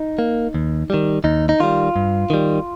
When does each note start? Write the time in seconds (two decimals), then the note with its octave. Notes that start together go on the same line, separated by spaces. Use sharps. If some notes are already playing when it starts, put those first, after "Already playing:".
Already playing: D#4
0.19 A#3
0.54 D#2
0.90 D#3 G3
1.24 D#2 D#4
1.49 D#4
1.60 D#3 G3 F4
1.96 G2
2.30 D#3 G3